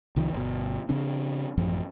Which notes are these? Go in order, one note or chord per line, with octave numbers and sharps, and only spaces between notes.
C2 D#3 F3
G1 B2
C#3 C4 D4
A1 F#2 F3